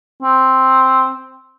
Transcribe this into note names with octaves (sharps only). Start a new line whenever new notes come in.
C4